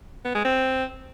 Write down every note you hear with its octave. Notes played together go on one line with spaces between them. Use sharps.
B3
G#3
C4